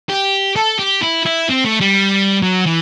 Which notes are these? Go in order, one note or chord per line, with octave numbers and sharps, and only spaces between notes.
G4
A4
G4
E4
E4
C4
A3
G3
F#3
E3